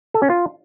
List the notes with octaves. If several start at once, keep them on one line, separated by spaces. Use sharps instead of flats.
A4
C#4
F4